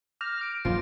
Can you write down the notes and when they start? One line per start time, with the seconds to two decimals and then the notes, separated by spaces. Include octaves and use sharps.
0.21 D6 F6 G6 A#6
0.41 D7
0.65 D#1 F#2 F3 F4 D7